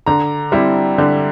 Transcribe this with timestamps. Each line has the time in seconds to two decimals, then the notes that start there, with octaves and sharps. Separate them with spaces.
0.06 D3 A#5
0.52 G3 C4 E4
0.98 D3